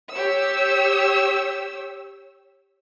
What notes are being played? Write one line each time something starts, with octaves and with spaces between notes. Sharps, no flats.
G4 C#5 E6